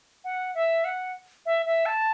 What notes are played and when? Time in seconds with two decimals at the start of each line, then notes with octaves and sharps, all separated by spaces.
0.24 F#5
0.55 E5
0.85 F#5
1.46 E5
1.66 E5
1.86 A5